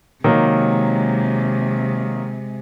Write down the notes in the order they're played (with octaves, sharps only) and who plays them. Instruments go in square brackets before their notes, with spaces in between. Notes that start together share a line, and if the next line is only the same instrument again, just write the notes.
[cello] C3 G#3 [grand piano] D#3 F#3 A#3